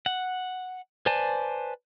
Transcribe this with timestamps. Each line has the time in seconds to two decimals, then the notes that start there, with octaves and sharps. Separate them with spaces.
0.06 F#5
1.06 B4 C5 D5 G#5 A5